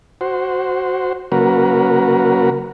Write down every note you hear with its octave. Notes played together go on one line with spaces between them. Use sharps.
F#4 C5
C#3 F#3 A#3 F#4 A#4 B4